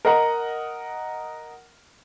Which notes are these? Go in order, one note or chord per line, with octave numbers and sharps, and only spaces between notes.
A#4 D#5 F#5 A#5